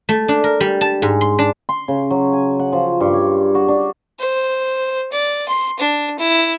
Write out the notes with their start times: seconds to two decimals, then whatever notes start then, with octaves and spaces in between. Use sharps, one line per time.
0.09 A3
0.28 D4
0.44 A#4
0.60 G3
0.81 A5
1.02 G#2
1.21 C6
1.39 D4
1.69 C6
1.88 C#3
2.11 F#3
2.33 G#5
2.59 F#5
2.73 F3
3.00 G2
3.14 C#5
3.55 F#4
3.68 D4
4.19 C5
5.12 D5
5.48 C6
5.79 D4
6.19 E4